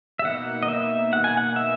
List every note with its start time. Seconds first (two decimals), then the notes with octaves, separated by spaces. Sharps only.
0.19 E5
0.25 B2 A#3 D#4 F#5
0.62 D#5
0.68 E5
1.13 F#5
1.24 G#5
1.37 F#5
1.56 E5